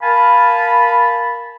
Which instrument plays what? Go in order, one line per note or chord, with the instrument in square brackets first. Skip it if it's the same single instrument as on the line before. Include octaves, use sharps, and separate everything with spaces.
[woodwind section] A#4 F5 G#5 A5 B5